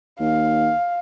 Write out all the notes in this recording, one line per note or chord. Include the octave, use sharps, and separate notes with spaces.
D#2 F5